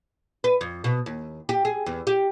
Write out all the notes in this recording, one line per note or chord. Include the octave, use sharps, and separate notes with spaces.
B4
F2
B2
D#2
G4
G#4
E2
G4